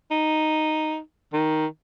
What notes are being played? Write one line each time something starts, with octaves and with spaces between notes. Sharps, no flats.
D#4
D#3